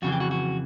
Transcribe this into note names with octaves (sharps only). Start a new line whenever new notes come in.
F2 C#3 E3 F#4
G4
F#4
F#4